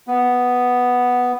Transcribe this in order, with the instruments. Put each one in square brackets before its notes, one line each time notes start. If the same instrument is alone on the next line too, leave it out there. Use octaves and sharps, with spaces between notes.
[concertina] B3